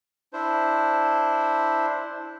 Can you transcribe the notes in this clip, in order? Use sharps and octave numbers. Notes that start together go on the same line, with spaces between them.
D4 E4 C5